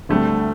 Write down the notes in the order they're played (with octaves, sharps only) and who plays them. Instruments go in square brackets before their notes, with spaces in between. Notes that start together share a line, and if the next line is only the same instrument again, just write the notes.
[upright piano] D2 D3 G3 C4 [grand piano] A3